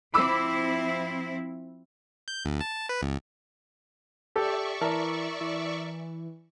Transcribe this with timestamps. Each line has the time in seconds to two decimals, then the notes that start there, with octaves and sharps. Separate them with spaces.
0.14 F3 C4 E4 B5 D6 E6
2.28 G6
2.45 D2
2.61 A5
2.89 B4
3.02 C#2
4.36 G4 A4 D5 E5 C#6
4.81 E3 A#4 A5
5.41 E3